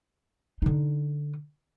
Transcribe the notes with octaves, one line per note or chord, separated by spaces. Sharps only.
D3 D#4